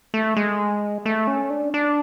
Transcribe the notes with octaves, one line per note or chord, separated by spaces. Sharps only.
A3
G#3
A3
C#4
D4
D4